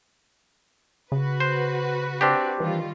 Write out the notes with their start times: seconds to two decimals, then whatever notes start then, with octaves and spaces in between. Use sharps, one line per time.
1.12 C#3 F#4 B4
1.40 C5
2.21 C4 D4 G4
2.60 D#3 E3 G3 F4